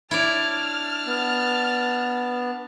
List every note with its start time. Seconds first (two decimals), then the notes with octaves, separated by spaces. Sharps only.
0.11 D4 E4 C#5 D5 A5 F6
1.06 B3